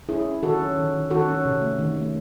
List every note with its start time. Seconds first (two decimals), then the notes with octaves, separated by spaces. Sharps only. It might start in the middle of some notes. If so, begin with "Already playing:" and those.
0.09 C#4 E4 G#4
0.25 C#4
0.43 D#3 F#4 A4
0.59 C#4
0.77 D#3
0.93 D#3
1.10 D#3 F#4 A4
1.28 C#4
1.45 C3
1.62 A3
1.79 D#3
1.96 A3